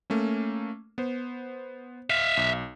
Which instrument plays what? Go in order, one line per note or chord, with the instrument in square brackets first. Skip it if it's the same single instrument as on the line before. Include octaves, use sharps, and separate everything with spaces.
[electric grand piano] A3 A#3 C#4
B3 C5
[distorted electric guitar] E5 F5
[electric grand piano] B1